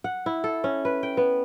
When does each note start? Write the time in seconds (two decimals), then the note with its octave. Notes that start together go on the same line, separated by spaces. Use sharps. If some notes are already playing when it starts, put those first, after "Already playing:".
0.04 F#5
0.26 E4
0.44 A4
0.64 C#4
0.85 B4
1.03 G5
1.17 B3